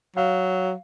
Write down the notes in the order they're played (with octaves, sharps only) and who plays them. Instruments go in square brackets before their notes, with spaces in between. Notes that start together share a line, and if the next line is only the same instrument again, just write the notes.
[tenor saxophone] F#3 [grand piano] F5